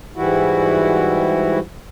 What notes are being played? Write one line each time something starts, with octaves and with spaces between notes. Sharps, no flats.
G#2 E3 G3 E4 F#4